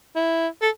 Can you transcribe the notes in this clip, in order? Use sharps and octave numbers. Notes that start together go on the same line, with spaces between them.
E4
A4